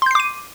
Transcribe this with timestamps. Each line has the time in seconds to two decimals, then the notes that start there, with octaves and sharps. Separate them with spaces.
0.02 C6
0.06 G6
0.11 C7
0.15 D6
0.20 D#7